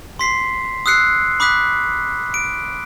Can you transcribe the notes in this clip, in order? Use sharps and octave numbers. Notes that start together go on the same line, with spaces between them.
C6 B6 C7
D#6 E6 F#6 C7 C#7
B5 D6 D#6 F#6 B6
D7